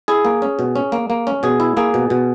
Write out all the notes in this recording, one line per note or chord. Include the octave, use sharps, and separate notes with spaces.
E4 G#4
A#3
C#4
B2
C#4
A#3
A#3
C#4
B2 G#4
E4
A#3 G#4
B2
B2